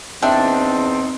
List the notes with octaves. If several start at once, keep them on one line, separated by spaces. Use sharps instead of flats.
E2 C4 D4 D#4 E5 G5